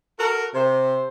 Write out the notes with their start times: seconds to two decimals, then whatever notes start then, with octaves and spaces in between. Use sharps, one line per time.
0.20 F#4 A4 A#4
0.55 C3 C5